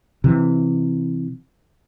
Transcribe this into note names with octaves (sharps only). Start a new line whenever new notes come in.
C3 E3